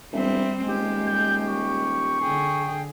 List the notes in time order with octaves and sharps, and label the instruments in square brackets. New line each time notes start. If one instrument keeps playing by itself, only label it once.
[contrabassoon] E1 [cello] G3 C4 [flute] E5
[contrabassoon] D#1 [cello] G#3 [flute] G4
[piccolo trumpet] G6
C#6
[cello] D3 G#4 [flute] G5